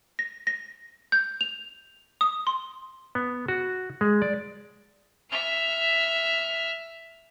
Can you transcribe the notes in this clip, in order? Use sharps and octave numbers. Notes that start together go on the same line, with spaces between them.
A#6
A#6
G6
F7
D#6
C6
B3
F#4
G#3
D5
E5 F6